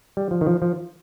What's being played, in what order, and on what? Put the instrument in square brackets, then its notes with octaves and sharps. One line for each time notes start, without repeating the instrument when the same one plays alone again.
[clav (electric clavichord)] G3
F3
D#3
F3
F3